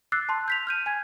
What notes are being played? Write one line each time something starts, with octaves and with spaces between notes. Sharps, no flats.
D6 E6 F#6 A6 C7
A5 C6
G6 B6 F7
F6 G6 D#7
G#5 G#6